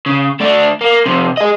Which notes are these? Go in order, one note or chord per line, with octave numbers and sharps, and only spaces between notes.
C#3
A3 D4
A#3
F2 C3
G#4 D#5